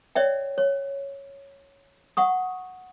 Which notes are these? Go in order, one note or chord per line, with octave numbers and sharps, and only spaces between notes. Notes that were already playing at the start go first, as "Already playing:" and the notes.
C#5 D5 E5 G5
C#5
F#5 C#6 D#6